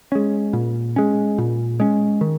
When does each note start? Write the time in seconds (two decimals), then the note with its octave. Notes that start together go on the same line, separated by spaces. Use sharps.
0.12 G#3 C#4
0.53 A#2
0.96 G#3 C#4
1.38 A#2
1.80 G#3 C#4
2.21 D#3